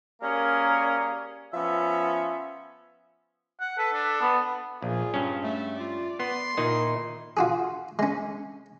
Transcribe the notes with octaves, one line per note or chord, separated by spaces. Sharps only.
G3 A#3 C#4 G#4 A#4
F3 B3 C#4 E5
F#5
A4 B4
D4
B3
A#1 F4 G#4
G2 C#4
A3 E5
F4 D5
B3 C6
A#2 D#3 D#4 E4
F4 F#4 G#4
G#3 C#4